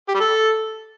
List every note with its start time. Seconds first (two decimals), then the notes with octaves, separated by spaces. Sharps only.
0.08 G4
0.14 G3
0.20 A4